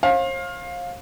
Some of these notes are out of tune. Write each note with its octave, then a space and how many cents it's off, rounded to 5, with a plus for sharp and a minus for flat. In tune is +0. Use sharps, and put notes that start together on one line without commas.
C5 +45 F5 +15